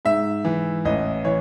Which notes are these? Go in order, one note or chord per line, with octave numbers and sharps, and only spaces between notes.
G#2 E5
E3
A1 D#5
E3 C#5